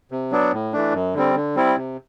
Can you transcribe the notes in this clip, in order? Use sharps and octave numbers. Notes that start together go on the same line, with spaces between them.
C3
F#3 B3 D4
A2
E3 A3 D4
F#2
D3 G3 C4
D3
G3 C4 E4
C3